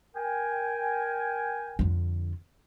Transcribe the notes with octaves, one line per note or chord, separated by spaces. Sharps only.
A#4 G5 G#5
F2 D3